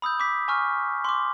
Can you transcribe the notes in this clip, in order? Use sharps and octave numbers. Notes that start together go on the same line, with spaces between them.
B5 D#6 E6 G6
D6 B6
G#5 C#6 F6
C6 D6